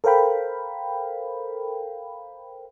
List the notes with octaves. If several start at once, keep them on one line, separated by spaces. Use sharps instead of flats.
A4 A#4 C5 F5 G5 B5